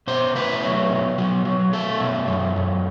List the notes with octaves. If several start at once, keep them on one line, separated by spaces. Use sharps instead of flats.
B2 C5
A3 B4
F#3
B2
F#3
F#3
A3 A4
B2
F#2
F#2